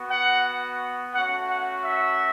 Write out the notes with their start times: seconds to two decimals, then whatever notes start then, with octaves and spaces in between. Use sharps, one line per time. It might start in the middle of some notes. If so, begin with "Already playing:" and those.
Already playing: B3 F#4
0.10 F#5
1.14 A3 C#4 F#4 F#5
1.49 F#5
1.83 E5